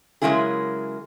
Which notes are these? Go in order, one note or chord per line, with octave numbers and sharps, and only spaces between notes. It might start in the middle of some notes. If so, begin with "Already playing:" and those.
C#3 F#3 G#3 A#3 E4 G#4